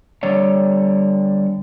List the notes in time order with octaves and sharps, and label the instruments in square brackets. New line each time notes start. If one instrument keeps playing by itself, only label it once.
[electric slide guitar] D3 G3 C#5 D5